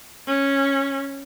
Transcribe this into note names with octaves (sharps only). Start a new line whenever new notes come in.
C#4